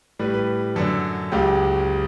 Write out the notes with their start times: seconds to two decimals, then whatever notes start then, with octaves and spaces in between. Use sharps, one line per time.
0.19 A2 G3 B4
0.34 B4
0.76 F#2 D3 F#3 A4
1.32 C#2 C#3 F#3 G4